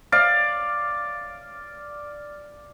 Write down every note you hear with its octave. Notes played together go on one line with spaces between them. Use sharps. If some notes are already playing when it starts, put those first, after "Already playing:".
D5 F5